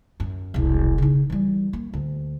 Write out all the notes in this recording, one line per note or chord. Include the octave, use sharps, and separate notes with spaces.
F#2
E1 C2
C#3 D#4
E3 G3
A#3
D2